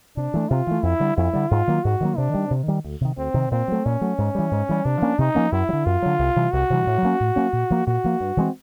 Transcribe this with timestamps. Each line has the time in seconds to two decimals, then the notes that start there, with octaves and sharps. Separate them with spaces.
0.17 C3 D4
0.34 E3 A3
0.49 C3 F4
0.67 E3 A3
0.83 F2 E4
1.00 D3 G3
1.17 F2 E4
1.33 D3 G3
1.51 G#2 F4
1.67 D#3 F#3 A#3
1.84 G#2 F#4
2.00 D#3 F#3 A#3
2.18 C3 D4
2.34 D#3 G3
2.51 C3
2.68 D#3 G3
2.84 D2
3.01 C3 D#3
3.17 D2 C4
3.34 C3 D#3
3.51 A#2 C4
3.68 F#3 A3
3.85 A#2 C#4
4.01 F#3 A3
4.18 G#2
4.35 E3 G3
4.51 G#2
4.69 E3 G3
4.85 C3 D4
5.02 F3 A#3 C#4
5.18 C3 D#4
5.35 F3 A#3 C#4
5.52 F#2 E4
5.69 F#3
5.73 D3
5.86 F#2 F4
6.02 D3 F#3
6.19 C2
6.36 C3 E3 G3
6.52 C2 F#4
6.70 C3 E3 G3
6.86 A2
7.02 F#3 A#3 C#4
7.20 A2
7.36 F#3 A#3 C#4
7.53 A#2
7.70 F3 A#3
7.87 A#2 F#4
8.04 F3 A#3
8.20 G2
8.37 E3 G#3 C4